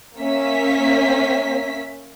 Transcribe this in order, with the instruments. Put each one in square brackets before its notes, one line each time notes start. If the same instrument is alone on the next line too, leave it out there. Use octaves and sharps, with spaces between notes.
[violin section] A#3 C#4 E5 B6